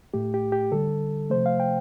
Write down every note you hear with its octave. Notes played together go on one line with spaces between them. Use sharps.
A2 A3 G4
G4
G4
D3 G3 A4
C3 F3 A3 C5
F5
G5